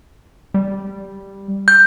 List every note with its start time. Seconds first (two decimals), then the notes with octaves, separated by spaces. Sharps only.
0.54 G3
1.68 G6